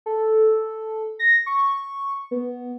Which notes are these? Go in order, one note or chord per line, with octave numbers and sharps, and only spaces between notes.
A4
A#6
C#6
B3